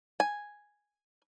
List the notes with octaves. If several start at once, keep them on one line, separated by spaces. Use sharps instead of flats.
G#5